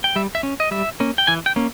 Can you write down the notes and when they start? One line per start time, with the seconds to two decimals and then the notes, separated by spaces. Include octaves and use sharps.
0.04 G5
0.16 G3 E5
0.35 E5
0.43 C#4
0.60 D#5
0.71 G3 E5
1.00 A#3 C#4
1.18 G5
1.27 E3 G#5
1.46 G5
1.56 A#3 C#4